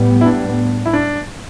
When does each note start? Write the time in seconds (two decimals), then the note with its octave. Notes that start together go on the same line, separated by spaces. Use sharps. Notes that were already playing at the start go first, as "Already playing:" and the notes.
Already playing: A2 G3 B3
0.21 E4
0.25 D4
0.86 E4
0.93 D4